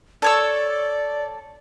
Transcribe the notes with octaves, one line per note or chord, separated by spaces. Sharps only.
A4 C#5 D5 E6